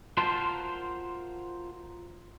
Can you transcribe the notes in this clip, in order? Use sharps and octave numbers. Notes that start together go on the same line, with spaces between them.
F4 F#4 A#4 C5 A5 C6